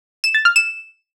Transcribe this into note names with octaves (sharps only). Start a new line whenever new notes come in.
E7
A6
F6
E7